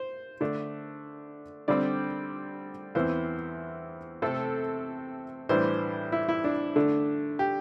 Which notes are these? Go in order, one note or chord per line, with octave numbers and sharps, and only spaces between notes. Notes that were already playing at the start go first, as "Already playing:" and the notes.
Already playing: C5
D3 A3 D4
D3 G3 C4 D5
E2 E3 C4 C5
C3 A3 C4 A4
A2 E3 G3 D4 C5
E4
E4
D4
D3 A3 D4
G4